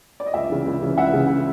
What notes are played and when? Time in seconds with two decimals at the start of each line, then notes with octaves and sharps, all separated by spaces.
0.20 D5
0.26 D#5
0.34 C#2 D5 E5
0.50 C#3 E3
0.66 C#2
0.82 C#3 E3
0.97 C#2 E5 F#5
1.14 C#3 E3